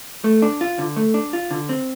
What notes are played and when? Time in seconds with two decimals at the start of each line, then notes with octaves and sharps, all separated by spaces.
0.24 A3
0.42 D4
0.61 F4
0.79 D3
0.96 A3
1.14 D4
1.33 F4
1.51 D3
1.69 C4